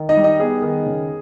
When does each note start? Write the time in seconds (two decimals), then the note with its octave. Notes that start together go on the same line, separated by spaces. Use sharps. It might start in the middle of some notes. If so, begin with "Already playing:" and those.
Already playing: D#3
0.09 D#4 D#5
0.17 G3
0.24 D#4 D#5
0.40 B3 G#4
0.62 D#3
0.86 C#3